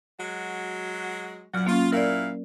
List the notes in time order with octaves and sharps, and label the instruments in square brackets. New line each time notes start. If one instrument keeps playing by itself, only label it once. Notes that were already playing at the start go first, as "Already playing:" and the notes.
[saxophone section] F#3 G#3 F#4
[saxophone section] F#2 A#2 F#5 [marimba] F#3 F6
[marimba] A#3 C#4 [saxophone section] F4
[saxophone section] A#2 E4 F5 [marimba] A#4 D5